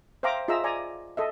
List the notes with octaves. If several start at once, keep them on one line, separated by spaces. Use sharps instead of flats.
C5 E5 F5 G5 A#5 D6
F4 G#4 D#5 E5 A#5 E6
D5 G#5 A#5
A4 D#5 E5